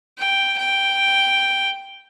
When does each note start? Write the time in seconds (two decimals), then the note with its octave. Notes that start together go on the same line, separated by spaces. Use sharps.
0.18 G5
0.58 G5